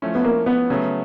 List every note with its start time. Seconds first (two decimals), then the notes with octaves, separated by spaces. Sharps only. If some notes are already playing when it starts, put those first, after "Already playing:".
0.02 F3 A3 C#4 E4
0.15 B3
0.24 A#3
0.46 B3
0.70 C#3 F#3 A3